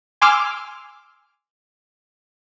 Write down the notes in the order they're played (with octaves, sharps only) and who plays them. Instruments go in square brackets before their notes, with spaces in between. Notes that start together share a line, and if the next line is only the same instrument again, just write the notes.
[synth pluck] G#5 C6 D6 E6 F6